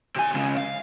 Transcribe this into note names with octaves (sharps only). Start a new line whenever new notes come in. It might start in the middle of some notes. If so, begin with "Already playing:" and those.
C3 G#5
C#2 C#3
F5